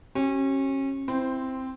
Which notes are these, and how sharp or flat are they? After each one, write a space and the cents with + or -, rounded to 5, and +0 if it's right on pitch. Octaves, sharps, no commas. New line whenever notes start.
C#4 -30 G4 -45
C4 +0 E4 +5 C5 -10